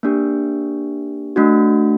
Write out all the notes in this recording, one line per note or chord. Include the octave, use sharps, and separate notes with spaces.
A#3 D4 G4
A3 D4 F#4